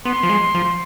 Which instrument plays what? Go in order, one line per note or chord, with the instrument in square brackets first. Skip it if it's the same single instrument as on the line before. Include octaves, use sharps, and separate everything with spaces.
[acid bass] B3 [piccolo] C6
[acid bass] F3
G#3
F3